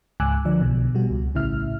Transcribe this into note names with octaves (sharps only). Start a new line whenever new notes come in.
C#2 G#2 G#5 D6 E6 F#6
D3 F3 D5
B1 B2
B2 G3 F#4
C#2
A#1 A2 C#3 E4 E5 F6